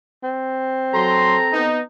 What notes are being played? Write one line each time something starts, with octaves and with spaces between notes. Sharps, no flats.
C4
F#3 A4 A#5 C6
B3 D#4